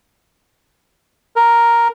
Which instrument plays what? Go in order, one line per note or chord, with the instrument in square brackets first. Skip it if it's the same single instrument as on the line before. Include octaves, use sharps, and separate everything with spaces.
[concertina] A#4